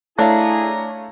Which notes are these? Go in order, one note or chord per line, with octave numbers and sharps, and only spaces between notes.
A3 D4 E4 G#4 C#5 F5 A#5